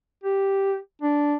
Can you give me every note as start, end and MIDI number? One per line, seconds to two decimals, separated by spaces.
0.24 0.76 67
1.02 1.35 62